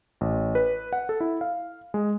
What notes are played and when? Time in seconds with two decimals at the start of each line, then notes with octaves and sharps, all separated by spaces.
0.21 A1
0.55 B4
0.93 F#5
1.09 A4
1.20 E4
1.41 F5
1.94 G#3